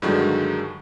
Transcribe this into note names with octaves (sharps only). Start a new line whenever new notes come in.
G2 D3 D#3 F#3 G#3